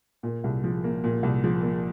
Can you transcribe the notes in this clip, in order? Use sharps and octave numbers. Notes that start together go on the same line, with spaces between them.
A#2
C2
F3
A#3
A#2
C2
F3
A#3